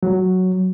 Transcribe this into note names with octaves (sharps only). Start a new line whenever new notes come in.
F#3